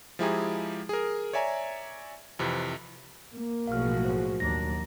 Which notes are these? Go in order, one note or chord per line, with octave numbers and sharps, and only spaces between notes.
F3 G#3 E4 G4 G#4 A#5
G#4 A#4
C#5 D5 E5 G#5 A#5
F2 C3 E3
A#3
B1 A2 F3 F#4 G#4 F5 F6
C5
D#2 F#3 D4 A#5 A#6